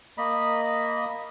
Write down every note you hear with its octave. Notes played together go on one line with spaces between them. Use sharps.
A#3 D#5 B5